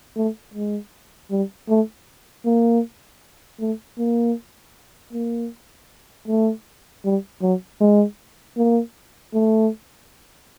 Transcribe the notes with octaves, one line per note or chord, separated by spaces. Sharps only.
A3
G#3
G3
A3
A#3
A3
A#3
A#3
A3
G3
F#3
G#3
A#3
A3